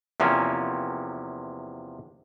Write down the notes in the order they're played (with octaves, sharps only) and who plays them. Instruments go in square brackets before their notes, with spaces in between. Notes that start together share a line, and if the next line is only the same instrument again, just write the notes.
[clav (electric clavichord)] E2 C3 F3 A#3 C#4